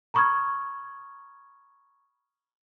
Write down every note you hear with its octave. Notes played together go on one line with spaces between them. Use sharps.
A#5 B5 C#6 D#6 F6 G#6